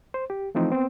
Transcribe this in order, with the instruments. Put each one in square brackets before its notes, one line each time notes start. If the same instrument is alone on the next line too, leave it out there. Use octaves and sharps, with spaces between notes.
[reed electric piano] C5
G4
E3 F3 A3 C4 D#4
B3 C4